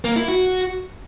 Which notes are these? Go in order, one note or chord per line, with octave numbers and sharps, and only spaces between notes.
A#3
E4
F#4